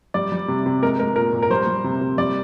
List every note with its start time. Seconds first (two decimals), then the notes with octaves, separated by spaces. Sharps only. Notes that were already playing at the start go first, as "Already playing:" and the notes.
0.14 G3 D5
0.32 G3
0.48 C3
0.66 C3
0.82 G#3 A#4
1.00 G#3 A#4
1.16 A#2 A#4
1.33 A#2
1.42 A#4
1.50 G3 C5
1.67 G3
1.84 C3
2.01 C3
2.18 G3 D5